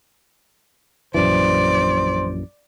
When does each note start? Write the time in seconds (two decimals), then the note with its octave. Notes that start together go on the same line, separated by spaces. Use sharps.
1.14 A#1 F#2 E3 C5 D5